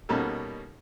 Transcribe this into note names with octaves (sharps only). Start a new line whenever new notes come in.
B2 G3 A#3 C#4 D#4 A4